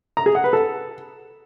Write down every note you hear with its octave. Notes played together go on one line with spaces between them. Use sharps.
A#5
G#4
F#5
B4
A4